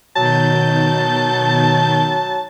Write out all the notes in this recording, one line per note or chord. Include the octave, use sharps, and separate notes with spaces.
B2 D#3 F#3 A5 G6